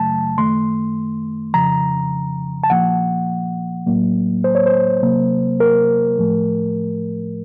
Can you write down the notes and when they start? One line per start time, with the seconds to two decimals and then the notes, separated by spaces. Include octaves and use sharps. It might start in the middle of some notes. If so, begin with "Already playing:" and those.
Already playing: F#2 C#3 F#3 A3 A5
0.38 F#2 D#3 A3 C6
1.54 F2 C#3 F3 A#5
2.64 A5
2.70 A#2 F3 A#3 F#5
3.86 A2 F#3 A#3
4.44 C5
4.55 C#5
4.66 C5
5.02 C3 F#3 A#3
5.60 A#4
6.19 A2 F3 A3